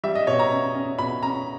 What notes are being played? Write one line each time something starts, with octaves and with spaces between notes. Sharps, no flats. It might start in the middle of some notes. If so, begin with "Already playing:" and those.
G3 E5
D#5
B2 C#5
A#5
C#4
C#4
B2 B5
C#4 A#5